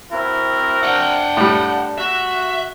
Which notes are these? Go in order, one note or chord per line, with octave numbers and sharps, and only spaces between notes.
C4 E4 F#4 A#4
D4 F#5 G5
A2 G3
F#4 E5